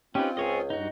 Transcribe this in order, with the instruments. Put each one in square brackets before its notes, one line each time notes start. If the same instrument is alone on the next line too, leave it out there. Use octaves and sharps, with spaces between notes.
[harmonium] C4 F4 [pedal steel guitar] C#4 D#4 B4 [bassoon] G4
[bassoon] C#2 [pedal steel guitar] G#4 C#5 D#5
[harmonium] G2 [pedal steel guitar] D#4 F#4